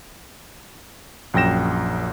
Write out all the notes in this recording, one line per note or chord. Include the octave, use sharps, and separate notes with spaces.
A#1 F#2 G5 A#6 E7